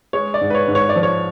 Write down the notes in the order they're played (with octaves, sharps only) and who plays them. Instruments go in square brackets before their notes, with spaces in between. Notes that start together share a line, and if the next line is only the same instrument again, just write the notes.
[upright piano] G#3 C#5
D5
G#2
B4
C#5
G#2
C#5
D5
F3
C#5